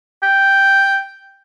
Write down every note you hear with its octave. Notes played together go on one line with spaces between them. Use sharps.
G5